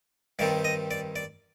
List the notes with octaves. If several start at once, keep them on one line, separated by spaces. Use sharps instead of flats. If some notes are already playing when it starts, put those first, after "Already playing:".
G2 D#3 G3 C4 D5
D#5
D5
D5